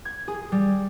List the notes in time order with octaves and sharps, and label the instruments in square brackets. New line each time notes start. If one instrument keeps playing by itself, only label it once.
[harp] G#6
G#4
G3